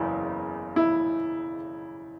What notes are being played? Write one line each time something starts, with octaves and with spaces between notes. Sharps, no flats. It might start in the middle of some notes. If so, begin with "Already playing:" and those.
Already playing: F#1 E2 C#3 E4
E4